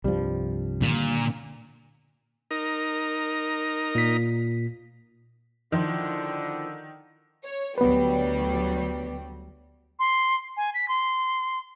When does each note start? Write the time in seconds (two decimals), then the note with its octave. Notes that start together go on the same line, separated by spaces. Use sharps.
0.04 C2 G2 F3 G3
0.82 A#2 D3 D#3 A#3
2.51 D#4 A#4
3.95 A#2 B6
5.72 D3 D#3 F3 E4 C5
7.45 C#5
7.78 D2 F#3 G3 B3 B4
9.99 C6
10.57 G#5
10.74 B6
10.88 C6